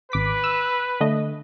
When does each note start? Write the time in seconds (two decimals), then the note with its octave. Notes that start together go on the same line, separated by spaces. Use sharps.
0.12 G#1 B4 D6 B6
0.44 E6
1.01 D3 A3 D#5